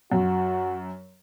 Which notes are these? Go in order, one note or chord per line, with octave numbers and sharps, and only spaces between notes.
F#2 F#4